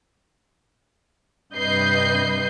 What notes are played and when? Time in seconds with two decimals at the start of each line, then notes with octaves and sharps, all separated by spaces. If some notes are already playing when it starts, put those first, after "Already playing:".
1.52 G2 C3 B4 D#5 G6 C7